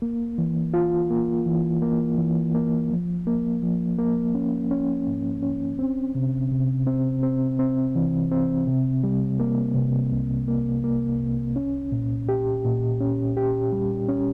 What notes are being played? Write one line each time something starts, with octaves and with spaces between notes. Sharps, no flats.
A#3
E3
F4
A#3
E3
A#3
E3
A#3
F3
A#3
F3
A#3
C#4
C#4
G#2
C#4
C4
C3
C3
C4
C4
C4
E3
C4
C3
G3
A#3
C3
C2
A#3
A#3
C2
C#4
A#2
G4
A#2
C#4
G4
G3
C#4